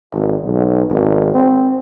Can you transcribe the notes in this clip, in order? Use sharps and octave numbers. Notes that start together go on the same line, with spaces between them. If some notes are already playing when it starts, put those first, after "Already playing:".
G#1
B1
G#1
C4